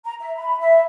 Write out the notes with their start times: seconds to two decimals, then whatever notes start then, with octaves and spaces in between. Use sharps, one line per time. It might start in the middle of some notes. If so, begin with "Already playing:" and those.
0.04 A#5
0.20 E5
0.37 B5
0.60 E5